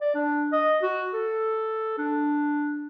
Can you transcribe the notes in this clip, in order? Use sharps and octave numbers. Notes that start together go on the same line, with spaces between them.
D5
D4
D#5
F#4
A4
D4